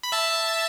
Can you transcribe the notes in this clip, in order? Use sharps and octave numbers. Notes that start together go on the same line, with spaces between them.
B5
E5 A5